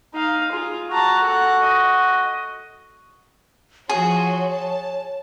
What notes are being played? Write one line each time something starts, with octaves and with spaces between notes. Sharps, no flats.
D#4 F5
F4 G#4
F#4 A5 A#5
A4 F#5
D#5
F3 F#4 G#4 C#5 C6
A5